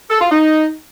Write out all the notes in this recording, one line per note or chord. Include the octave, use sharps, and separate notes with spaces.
A4
F4
D#4